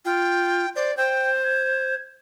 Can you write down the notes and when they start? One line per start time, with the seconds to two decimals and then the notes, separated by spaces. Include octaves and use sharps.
0.05 F4 G5
0.75 C5 D5
0.97 C5 G5
1.44 G#6